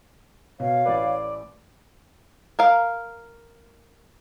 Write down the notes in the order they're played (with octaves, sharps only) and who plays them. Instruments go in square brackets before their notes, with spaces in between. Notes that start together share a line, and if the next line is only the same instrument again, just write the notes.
[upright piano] B2 [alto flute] C#5 [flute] F5
[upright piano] A1 B4 [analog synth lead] D5
[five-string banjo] A#4 F5